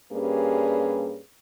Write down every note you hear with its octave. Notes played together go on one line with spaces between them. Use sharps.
G2 G3 A#3 C#4 G#4 B4